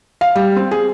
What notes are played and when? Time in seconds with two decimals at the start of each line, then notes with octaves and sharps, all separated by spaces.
0.21 F5
0.35 G3
0.56 C4
0.71 G#4